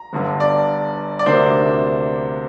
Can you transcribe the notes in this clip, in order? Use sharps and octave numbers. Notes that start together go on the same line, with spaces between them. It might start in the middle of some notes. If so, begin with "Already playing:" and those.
Already playing: A#5
G1 G2 D3
D5
D5
D2 C3 A#3 D4 C5